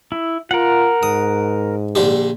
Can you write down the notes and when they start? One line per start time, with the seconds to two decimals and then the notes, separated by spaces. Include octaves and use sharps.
0.12 E4
0.51 F4 A#4 F#5
1.03 G#2 D#6
1.95 A#1 D3 G4